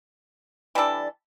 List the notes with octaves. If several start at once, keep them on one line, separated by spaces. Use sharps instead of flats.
E3 G3 D4 A4